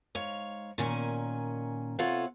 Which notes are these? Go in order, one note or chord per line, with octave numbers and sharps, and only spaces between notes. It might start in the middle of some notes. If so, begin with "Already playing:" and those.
G#2 C#5 F5
A#2 D#3 C#4 G#5
C3 F4 A4 C#5 F5 F#5